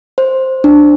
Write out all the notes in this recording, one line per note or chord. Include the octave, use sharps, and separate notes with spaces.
C5
D4